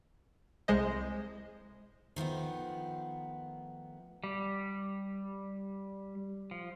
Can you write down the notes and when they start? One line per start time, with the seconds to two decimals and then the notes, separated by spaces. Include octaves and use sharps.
0.68 C2 G#3 C5 D#5
2.16 D#3 F3 A3 B3
4.24 G3
6.51 F3